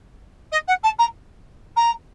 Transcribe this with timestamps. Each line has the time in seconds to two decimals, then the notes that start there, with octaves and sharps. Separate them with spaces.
0.52 D#5
0.68 F#5
0.83 A5
0.99 A#5
1.76 A#5